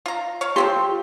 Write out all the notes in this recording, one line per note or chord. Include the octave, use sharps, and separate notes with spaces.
F4 A#5
C#5 F5
F3 C4 F4 G4 C6